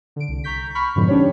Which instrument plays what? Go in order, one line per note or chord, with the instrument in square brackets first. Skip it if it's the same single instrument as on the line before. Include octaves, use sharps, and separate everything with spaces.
[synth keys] D3 D7
C2
A#5 C#6 G6 B6
B5 C#6 F6 B6
F2 G#2 B2 D3 F3
C#4 D4 G4 C5 C#5